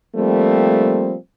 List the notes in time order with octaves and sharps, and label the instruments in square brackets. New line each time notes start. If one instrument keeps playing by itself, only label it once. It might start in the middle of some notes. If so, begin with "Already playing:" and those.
[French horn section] F3 G3 A3 A#3 C4